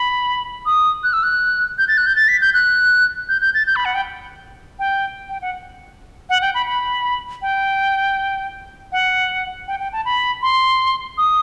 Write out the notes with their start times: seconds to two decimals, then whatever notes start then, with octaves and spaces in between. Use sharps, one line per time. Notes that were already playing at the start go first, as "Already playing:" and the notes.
Already playing: B5
0.66 D#6
1.04 F#6
1.13 E6
1.23 F#6
1.78 G6
1.88 A6
1.98 F#6
2.06 G6
2.16 A6
2.28 B6
2.41 G6
2.54 F#6
3.29 G6
3.41 G6
3.54 A6
3.67 G6
3.76 B5
3.85 F#5
3.95 G5
4.79 G5
5.29 G5
5.42 F#5
6.29 F#5
6.42 G5
6.54 B5
6.66 B5
7.42 G5
8.92 F#5
9.68 G5
9.80 G5
9.93 A5
10.05 B5
10.42 C6
11.18 D#6